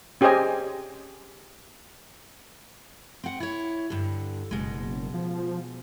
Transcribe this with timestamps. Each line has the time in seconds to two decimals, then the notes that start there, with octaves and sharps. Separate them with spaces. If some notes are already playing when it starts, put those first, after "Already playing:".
0.21 C#4 G4 G#4 C5 D#5 G#5
3.24 C4 F#5
3.40 E4 C#5
3.90 G2 D3
4.51 F#1 B2 G#3
5.14 F3